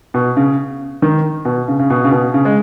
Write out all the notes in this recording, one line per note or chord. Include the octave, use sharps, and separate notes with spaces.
B2
C#3
D#3
B2
C#3
C#3
B2
C#3
B2
C#3
G#3